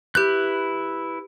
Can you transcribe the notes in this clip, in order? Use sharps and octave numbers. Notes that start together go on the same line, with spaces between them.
E4 G4 B4 F#6 G6